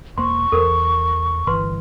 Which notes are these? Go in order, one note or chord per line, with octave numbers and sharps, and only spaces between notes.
E1 A#3 C5 C6 C#6
E2 A4 A#4 C5
G1 E3 B4 C6